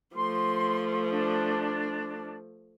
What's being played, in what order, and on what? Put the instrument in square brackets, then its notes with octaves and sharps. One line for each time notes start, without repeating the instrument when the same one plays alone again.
[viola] F3 A3 [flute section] C6
[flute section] D4